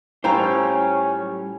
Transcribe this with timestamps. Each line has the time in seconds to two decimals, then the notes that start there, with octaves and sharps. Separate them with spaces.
0.24 A2 G3 C#4 F4 C5 G5 A#5